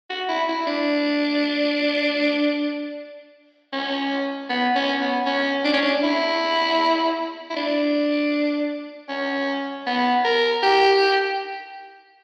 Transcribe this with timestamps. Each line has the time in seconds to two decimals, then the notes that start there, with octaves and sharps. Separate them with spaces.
0.10 F#4
0.28 E4
0.48 E4
0.66 D4
3.73 C#4
4.50 B3
4.76 C#4
5.01 B3
5.26 C#4
5.65 D4
5.74 C#4
5.82 D4
6.03 E4
7.50 E4
7.56 D4
9.09 C#4
9.87 B3
10.25 A#4
10.63 G4